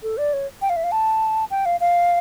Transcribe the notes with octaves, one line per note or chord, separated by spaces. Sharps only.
A4
D5
C#5
G5
F5
E5
F5
A5
G5
F5
F5